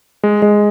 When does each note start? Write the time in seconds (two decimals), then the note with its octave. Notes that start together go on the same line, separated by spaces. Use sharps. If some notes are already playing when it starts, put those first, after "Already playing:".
0.23 G#3
0.42 G#3